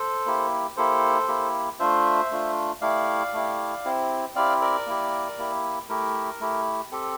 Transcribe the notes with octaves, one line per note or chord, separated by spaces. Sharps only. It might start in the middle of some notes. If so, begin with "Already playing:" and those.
Already playing: A4 C5
A#3 E4 G4
A#3 E4 G4 A4 C5
A#3 E4 G4
A3 D4 F4 C5 E5
A3 D4 F4
A3 E4 G4 D5 F5
A3 E4 G4
C4 E4 G4
C4 E4 G4 D5 F5
A#4 D5
A#3 E4 G4
A#3 E4 G4
A3 E4 G4 A#4
A3 E4 G4
C4 G4 A4